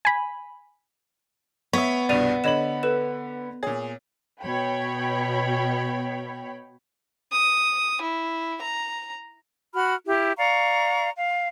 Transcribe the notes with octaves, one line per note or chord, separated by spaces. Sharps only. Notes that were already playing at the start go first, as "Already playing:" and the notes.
G#5 B5
B3 C#5 E5 B6
C2 G2 B2 D5 D#7 F7
D3 C#5 D#5 B5 E7 F#7
A4 B4 E7
A#2 G#4 C#5
B2 C#5 G5 B5
D#6
E4
A#5
F#4 B5 F6
E4 G4
D5 F5 A#5 C#6
F5